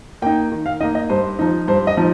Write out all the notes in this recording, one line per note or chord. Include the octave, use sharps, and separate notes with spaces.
A#3 D#4 G5
D#3
F5
A#3 D#4 D#5
D#5
G2 C5
F3 D#4
G2 C5
D#5
F3 D#4